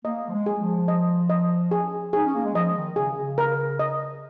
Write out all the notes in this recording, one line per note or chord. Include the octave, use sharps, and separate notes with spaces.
A#3 D#5
F3
G#3
G#4
F3
D#5
D#5
G#4
D#4 G#4
C#4
A#3
G#3
F3 D#5
D#3
C#3 G#4
C#3
A#4
D#5